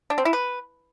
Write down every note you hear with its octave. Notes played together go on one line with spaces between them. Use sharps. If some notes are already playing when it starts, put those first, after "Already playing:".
D4
C4
E4
B4